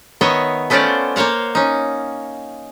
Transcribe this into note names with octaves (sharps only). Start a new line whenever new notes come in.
D#3 B3 C#5 D#5 E5
A3 B3 C#4 F4 C5 D5
A#3 C5 C#5 F5 F#5
C#4 D#4